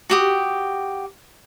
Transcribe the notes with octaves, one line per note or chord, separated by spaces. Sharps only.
F#4 G4 D#6